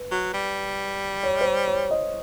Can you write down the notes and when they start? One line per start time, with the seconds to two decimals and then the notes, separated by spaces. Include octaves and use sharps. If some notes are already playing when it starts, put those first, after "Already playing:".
Already playing: B4
0.11 F#3
0.33 G3
1.23 C#5
1.41 C5
1.46 C#5
1.68 C#5
1.91 D#5